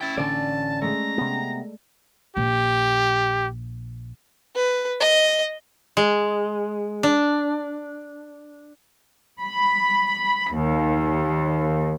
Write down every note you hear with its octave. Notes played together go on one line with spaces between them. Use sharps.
C#4 E4 G5 G#6 A6
A1 D3 D4 D5 A5
G#3 A3 A#5
C3 B3
A#1 G4
B4
D#5
G#3
D4
B5
D#2